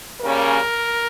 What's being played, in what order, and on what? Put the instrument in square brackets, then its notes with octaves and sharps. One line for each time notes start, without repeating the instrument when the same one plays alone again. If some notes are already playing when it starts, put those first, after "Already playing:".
[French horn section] C#3 G3 A#3 C#4 A#4